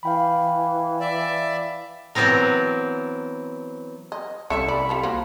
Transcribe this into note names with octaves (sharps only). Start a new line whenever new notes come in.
E3 F5 G5 B5
D5 E5
E3 F#3 B3 C4 A#4
D#5
C2 C#4 A4 E5 C#6
D5 B5
G3 F4 A4
A#3 F#4 C5